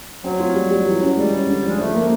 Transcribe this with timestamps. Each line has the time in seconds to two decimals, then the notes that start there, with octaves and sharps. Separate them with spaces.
0.24 F#3 C4
0.40 F4
0.55 G3
0.71 G3
0.87 E3
1.02 C#4
1.17 G3 G#3
1.32 C#4
1.48 D3
1.63 F3 G#3
1.79 F3 A3
1.95 A#3